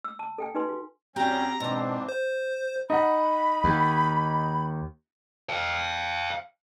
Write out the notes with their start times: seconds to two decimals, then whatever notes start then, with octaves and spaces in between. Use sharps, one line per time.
0.04 E6
0.19 A5
0.38 A4 G5 G#5
0.55 D#4 F#4 B4 G#5 C6
0.69 F#4
1.16 E2 G3 C4 C#4 F#4 G4 G5 A#5
1.60 G#2 B2 E3 C4 D4
2.09 C5
2.90 D#4 F#5 B5
3.64 D#2
5.49 F5 G5